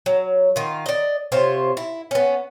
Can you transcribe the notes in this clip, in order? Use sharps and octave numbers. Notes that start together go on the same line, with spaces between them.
F#3
D#3 F4
D5 D#5
C3 F4 C5 C#5
E4
B3 C#4